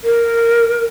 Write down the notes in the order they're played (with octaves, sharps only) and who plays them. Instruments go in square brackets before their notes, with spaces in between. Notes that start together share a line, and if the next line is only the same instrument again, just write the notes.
[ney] A#4